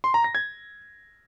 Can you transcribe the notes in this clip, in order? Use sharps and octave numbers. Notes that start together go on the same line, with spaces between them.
C6
A#5
A#6
G#6